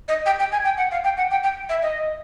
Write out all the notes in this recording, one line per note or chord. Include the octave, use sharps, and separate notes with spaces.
D#5
G5
G5
G#5
G5
F#5
F5
G5
F#5
G5
G5
E5
D#5